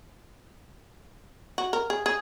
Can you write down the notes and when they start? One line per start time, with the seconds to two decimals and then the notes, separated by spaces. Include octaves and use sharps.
1.58 F#4
1.73 A#4
1.90 G#4
2.06 G#4